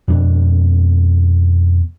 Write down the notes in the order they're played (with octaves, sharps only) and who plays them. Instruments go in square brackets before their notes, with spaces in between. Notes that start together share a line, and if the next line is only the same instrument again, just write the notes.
[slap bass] F2 B2 D4